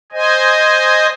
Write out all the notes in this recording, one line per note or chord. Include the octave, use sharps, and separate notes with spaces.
C5 D#5 G#5